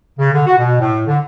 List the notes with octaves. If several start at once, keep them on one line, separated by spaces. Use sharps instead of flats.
C#3
D3
F#4
B2
A2
D3